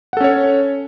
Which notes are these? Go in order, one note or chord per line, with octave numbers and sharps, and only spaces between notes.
C#4 A4 C#5 F#5